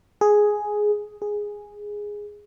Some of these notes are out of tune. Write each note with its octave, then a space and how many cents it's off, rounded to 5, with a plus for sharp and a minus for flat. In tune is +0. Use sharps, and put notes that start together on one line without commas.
G#4 +5
G#4 -5